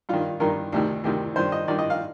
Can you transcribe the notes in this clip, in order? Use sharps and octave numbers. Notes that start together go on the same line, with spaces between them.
G2 D#3 F4
G2 D#3 A#4
D2 C3 D#3
D2 C3 D#3
G2 D#3 C5
D#5
G2 D#3 D5
D#5
F5